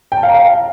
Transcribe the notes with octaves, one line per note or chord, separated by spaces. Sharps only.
G5
A5
F5
A#5
F5